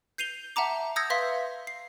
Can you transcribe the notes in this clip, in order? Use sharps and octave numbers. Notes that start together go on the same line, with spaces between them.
G6 C7 D#7 F7 G7
E5 F#5 A5 A#5 D6
D#6 E6 G6 G#6 A#6 C#7
B4 E5 F5 C6 B6
C7